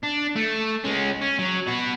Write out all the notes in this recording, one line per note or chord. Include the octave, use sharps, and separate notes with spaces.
D4
A3
G#3 C#4
C#4
F#3
B3 F#4